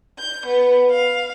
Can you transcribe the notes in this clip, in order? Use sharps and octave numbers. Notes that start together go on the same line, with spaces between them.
G6
B3
F5